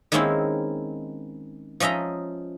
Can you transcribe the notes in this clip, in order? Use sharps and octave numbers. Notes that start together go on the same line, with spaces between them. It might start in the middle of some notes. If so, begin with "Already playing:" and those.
D#3 G#3 A#3 C4 C#4 E4
F3 C#4 D#5 E5 A#5